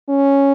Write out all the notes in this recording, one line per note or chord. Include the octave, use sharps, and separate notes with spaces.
C#4